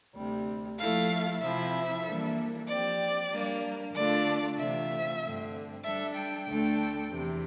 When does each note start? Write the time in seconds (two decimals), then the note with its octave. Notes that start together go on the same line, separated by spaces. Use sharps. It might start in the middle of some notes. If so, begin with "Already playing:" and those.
0.15 D2 C3 G3
0.79 F3 A3 E4 A4 F5
1.41 C3 F3 C4 E4 E5
2.04 E3 G3 A#3 D4 A4
2.68 F3 C4 G4 D5
3.31 G3 A#3 D4
3.94 D3 A3 D4 F4 D5
4.58 C3 E3 A3 C4 F4 E5
5.22 G2 D3 A3 C4
5.83 G3 D4 A4 E5
6.15 G5
6.47 D2 D3 A3 D4 A4
7.11 E2 C3 E3